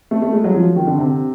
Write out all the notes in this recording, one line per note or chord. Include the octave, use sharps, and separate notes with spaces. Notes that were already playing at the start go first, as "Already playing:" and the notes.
A3
A3
G#3
F#3
F3
D#3
D3
C3